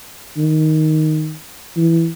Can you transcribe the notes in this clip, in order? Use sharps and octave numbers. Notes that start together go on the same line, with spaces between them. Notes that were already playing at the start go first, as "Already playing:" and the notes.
D#3
E3